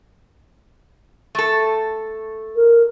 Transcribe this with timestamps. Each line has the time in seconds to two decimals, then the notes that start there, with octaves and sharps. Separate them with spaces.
1.35 A3 A4
2.56 A#4